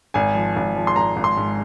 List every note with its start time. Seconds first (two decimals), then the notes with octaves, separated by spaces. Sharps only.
0.14 G#1 G#5
0.35 F3
0.56 G#1
0.75 F3
0.87 C6
0.96 G#1 A#5
1.16 G#1
1.24 C6
1.37 G#2